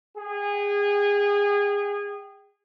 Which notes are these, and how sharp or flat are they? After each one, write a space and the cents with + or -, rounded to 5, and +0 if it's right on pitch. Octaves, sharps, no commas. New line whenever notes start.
G#4 -25 G5 -10